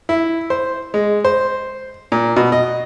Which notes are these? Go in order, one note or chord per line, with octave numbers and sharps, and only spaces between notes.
E4
C5
G#3
C5
A#2
B2
D#5